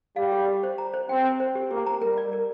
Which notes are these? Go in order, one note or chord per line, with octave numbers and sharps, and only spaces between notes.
G3 F5
G4
G4
C5
A#5
C5
C4 G5
C5
C5
G4
A#3 G4
A#5
G3 A#4
D5
A#4